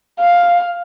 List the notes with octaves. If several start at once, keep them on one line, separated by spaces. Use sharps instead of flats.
F5